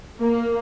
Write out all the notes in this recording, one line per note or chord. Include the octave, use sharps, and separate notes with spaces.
A#3